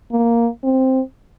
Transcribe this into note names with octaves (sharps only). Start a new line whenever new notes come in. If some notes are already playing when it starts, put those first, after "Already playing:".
A#3
C4